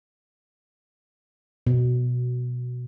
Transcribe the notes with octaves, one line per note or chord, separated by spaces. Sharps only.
B2